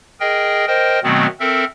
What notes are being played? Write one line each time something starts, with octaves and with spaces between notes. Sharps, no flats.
G#4 A#4 D#5 G5
A#4 C5 D#5 G5
B2 D#3 F#3 A3 B3 C4
C4 A4 A#4 E5